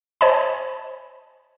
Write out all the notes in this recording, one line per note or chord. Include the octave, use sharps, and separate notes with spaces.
C5 C#5 D#5 G#5 A5 B5